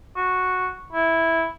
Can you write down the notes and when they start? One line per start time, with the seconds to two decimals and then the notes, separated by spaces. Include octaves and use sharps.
0.16 F#4
0.93 E4